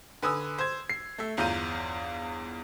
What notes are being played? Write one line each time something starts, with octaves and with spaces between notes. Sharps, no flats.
D3 B4 G#5 D#6 E6
C5 G#6
C7
A3 E5
G1 E2 F4 A#5 G6 D#7